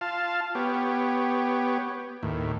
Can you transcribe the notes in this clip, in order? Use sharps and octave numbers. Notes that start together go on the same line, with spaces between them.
F4 F5 A5
B3 G4 C#5
D#2 A2